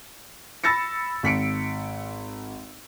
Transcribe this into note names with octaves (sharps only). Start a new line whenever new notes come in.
B5 E6 A6 A#6 C#7
G#1 B6 C#7 D7